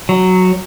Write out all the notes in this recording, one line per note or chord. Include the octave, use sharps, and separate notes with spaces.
F#3